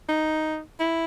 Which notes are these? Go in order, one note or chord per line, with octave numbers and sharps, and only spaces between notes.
D#4
E4